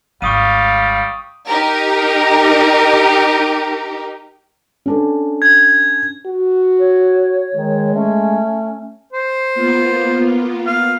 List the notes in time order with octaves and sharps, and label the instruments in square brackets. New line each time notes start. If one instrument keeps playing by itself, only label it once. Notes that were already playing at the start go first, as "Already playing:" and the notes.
[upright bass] G#1 G#3 [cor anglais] G3 [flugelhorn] F5 [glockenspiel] C#6 D#6 D#7
[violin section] D#4 G4 A#4
[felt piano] C#4 D4 A4
[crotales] G#6
[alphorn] F#4
[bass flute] C#5
[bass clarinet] D#3 [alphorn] G#3
[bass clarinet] A3 [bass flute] C#4
[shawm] C5
[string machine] A#3 B3 F4
[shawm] F5